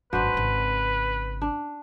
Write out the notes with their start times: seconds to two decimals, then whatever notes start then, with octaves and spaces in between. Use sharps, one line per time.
0.13 G#1 F#2 D4 F#4 B4 C5
0.34 G#1 C#3
1.42 D4